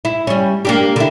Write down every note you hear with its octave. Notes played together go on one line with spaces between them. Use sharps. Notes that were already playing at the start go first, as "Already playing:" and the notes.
E4
G3 C#4
A#3 D4 G4
D3 E4